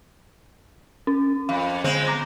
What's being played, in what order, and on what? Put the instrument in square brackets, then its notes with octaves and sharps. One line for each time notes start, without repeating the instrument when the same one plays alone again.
[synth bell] C#4
[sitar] F2 [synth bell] F5
[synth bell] D3 [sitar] G#3 C4
[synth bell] A#5 D6 A#6